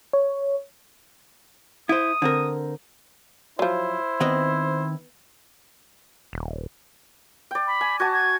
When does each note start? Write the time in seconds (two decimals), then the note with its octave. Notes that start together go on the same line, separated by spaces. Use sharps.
0.13 C#5
1.89 E4 C5 D#6
2.22 D3 C4 A#4
3.59 F3 F#3 E4 C5
4.20 D#3 B3 C4 D#5
6.33 D#1
7.51 D5 G5
7.67 B5
7.81 G#5
8.00 F#4 G#5 A5 G#6
8.13 G#6